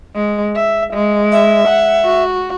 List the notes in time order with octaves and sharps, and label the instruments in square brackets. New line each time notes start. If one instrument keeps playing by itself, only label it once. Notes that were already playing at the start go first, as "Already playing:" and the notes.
[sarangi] G#3
E5
G#3
[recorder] E5
[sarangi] F#5
F#4